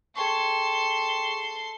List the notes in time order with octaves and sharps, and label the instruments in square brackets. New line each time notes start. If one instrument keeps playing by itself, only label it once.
[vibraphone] G#4 G5 C#6 [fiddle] A4 C6